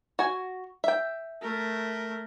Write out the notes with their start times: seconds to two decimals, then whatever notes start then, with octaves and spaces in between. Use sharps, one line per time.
0.19 F#4 G#5
0.84 E5 G5
1.42 A3 A#4